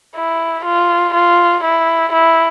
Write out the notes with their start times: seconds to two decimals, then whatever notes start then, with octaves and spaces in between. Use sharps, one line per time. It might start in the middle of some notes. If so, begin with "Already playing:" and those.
0.16 E4
0.65 F4
1.15 F4
1.64 E4
2.13 E4